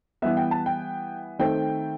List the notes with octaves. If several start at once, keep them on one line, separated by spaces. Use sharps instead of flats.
E3 G3 B3 E5
G5
A5
G5
D#3 A3 C4 G5